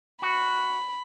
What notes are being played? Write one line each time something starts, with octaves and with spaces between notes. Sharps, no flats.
F#4 B5